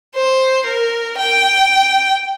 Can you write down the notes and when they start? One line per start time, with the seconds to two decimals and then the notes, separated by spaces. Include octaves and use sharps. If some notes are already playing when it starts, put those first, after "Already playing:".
0.16 C5
0.66 A#4
1.18 G5